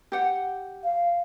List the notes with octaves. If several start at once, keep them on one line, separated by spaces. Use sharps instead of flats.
G4 F#5
F5